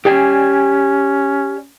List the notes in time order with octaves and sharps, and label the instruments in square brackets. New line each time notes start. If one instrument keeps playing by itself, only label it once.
[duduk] C#4 [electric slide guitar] G4 D5 G#5